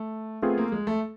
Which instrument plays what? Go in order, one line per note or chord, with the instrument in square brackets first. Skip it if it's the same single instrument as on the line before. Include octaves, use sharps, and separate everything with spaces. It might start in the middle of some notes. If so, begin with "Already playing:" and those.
Already playing: [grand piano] A3
[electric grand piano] A3 C4 F4 G#4 [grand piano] B3
[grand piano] A#3
G#3
A3